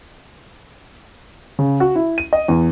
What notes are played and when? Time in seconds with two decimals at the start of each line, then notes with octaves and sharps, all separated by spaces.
1.59 C#3
1.80 F#4
1.95 E4
2.18 D#7
2.33 D#5
2.48 E2